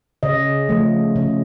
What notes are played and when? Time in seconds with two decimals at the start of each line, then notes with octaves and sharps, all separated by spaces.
0.23 C#3 D#5
0.69 F3 A3
1.16 C#3